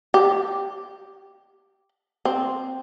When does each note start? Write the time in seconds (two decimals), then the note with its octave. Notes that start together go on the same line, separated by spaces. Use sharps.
0.14 G4
2.25 C4